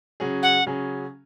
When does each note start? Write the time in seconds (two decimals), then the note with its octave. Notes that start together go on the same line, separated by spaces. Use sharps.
0.20 C#3 F#3 C#4 G#4
0.43 F#5
0.66 C#3 F#3 C#4 G#4